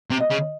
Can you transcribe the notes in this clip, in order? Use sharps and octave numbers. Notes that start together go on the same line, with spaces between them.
C3
D#5
C#3